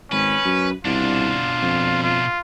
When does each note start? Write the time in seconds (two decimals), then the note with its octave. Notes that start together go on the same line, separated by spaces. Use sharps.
0.12 G#1 C#4 B4
0.45 F#2
0.85 C2 B2 D4 F4
1.62 F2
2.03 F4